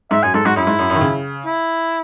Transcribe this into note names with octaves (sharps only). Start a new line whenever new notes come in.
G#2 E5
F#2 G#5
G#2 A4
G#2 F#4
F#2 E4
G#2
F#2
F#2
D#3
C#3
E4